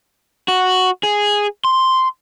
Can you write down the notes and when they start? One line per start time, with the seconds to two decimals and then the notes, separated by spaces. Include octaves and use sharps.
0.48 F#4
1.03 G#4
1.65 C6